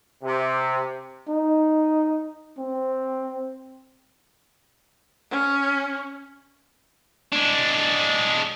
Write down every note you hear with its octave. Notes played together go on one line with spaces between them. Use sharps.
C3
D#4
C4
C#4
G#3 D4